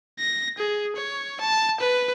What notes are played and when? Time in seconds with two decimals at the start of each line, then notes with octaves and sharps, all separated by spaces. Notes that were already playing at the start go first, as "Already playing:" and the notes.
0.19 A#6
0.58 G#4
0.96 C#5
1.41 A5
1.80 B4